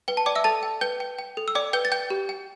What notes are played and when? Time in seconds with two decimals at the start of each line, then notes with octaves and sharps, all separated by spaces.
0.08 B4 G5
0.17 A5
0.26 D5 G5 D6
0.35 E5 E6
0.44 A4 A5 A6
0.63 G5
0.81 B4 G5 G6
1.00 G5
1.19 G5
1.37 A4
1.48 E6
1.55 D5 G5 D6
1.73 B4 G5 G6
1.85 A6
1.92 G5 G6
2.10 G4
2.29 G5